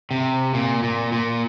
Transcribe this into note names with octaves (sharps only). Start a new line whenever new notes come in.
C3
A#2
A#2
A#2